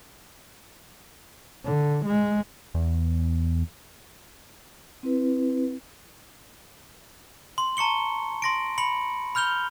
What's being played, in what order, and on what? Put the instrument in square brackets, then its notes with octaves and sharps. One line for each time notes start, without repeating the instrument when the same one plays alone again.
[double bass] D3
G#3
[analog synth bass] E2
[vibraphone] C4 E4 B4
[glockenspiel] C6
A5 A#5 C#6 C#7 G7
C6 A#6 D7
B5 C#7 F#7
B5 F6 G6 F7 G7